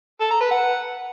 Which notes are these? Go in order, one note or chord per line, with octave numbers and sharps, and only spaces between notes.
A4
A#5
B4
F#5